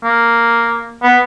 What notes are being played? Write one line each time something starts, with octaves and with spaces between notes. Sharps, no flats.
A#3
B3